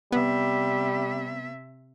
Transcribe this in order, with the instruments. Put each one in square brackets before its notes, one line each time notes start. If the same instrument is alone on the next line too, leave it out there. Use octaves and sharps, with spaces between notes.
[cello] C3 E5 [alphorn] G3 [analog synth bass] B3